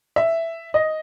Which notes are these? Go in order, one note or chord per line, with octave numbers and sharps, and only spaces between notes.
E5
D#5